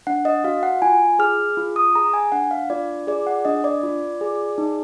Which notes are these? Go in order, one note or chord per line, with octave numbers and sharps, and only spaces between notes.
D4 F#5
D#5
F#4 F5
F#5
F4 G#5
G#4 F6
F4
D#6
G#4 A#5
G#5
D4 F#5
F5
F4 D5
G#4 D5
F#5
D4 D#5
D5
F4
G#4
D#4